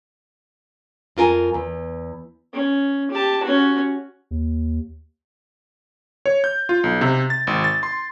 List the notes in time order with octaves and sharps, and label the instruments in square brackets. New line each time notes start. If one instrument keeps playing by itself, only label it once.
[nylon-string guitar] F2 F4 A#4 G#5
E2
[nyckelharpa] C#4
G4 A5
C#4 F#4
[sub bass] D#2
[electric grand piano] C#5
G6
F4
B1
C3
A6
G#1
A6
C6